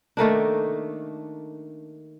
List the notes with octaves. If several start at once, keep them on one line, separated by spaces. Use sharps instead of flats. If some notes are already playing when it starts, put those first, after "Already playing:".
D#3 A3 A#3 D4